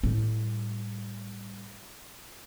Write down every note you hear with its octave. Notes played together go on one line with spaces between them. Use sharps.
A2 G3